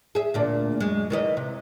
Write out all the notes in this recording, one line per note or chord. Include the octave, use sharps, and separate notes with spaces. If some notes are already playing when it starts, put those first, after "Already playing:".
G#4 E5
D2 A#2 D4
F#2 G#3
D#3 E3 D#5
C3